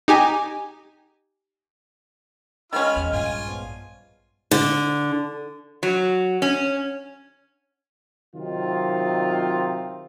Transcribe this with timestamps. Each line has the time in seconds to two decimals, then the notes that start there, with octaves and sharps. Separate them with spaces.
0.08 D#4 G4 G#5
2.73 D#3 G#3 C#4 F4 B5 F6
2.96 E2 C5 C#5 D#5
3.13 A#1 G2 F4 G#5
3.47 F3 B3 D5
4.51 D3
5.83 F#3
6.42 C#4
8.36 C3 D#3 F#3 C4 D#4 F4